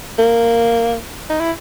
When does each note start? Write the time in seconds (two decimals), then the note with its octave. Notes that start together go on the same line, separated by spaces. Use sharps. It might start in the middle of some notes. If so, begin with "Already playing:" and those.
0.19 A#3
1.30 D#4
1.40 E4